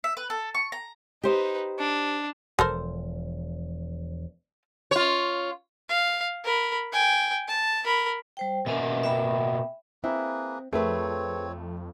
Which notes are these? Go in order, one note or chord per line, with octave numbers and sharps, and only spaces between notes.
E5
B4
A4
C#6
A#5
D#4 G4 B4 C5 D#5
D4
E1 F3 A4 A#4 C5
F4 C#5
F5
A#4 B5
G5 G#5
A5
A#4 B5
G3 C5 G5
B2 A#3 C#4 E5 G#5
E5 G5 B5
A#3 C4 E4 G#4 B4
F2 A3 C4 G#4 A#4 B4 C#5